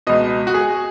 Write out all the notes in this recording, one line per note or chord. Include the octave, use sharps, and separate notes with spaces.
C#2 B2 D#5
F#4
G#4